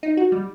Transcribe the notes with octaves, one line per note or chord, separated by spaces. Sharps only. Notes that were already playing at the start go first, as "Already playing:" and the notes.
D#4
F#4
G3